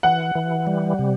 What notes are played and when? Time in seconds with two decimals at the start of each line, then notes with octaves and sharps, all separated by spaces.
0.03 E3 F#5
0.35 E3
0.67 G3
0.99 C3